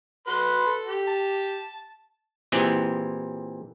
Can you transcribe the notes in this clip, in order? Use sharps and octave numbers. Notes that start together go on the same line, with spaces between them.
F#4 B4 C6
A4
G4
A5
A#2 E3 C4 E4 G4 G#4